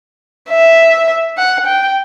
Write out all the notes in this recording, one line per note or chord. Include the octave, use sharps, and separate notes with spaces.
E5
F#5
G5